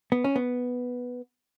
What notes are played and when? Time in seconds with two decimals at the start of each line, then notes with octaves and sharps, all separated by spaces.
0.12 B3
0.24 C#4
0.36 B3